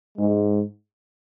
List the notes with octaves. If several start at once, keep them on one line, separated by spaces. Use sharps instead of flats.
G#2 G#3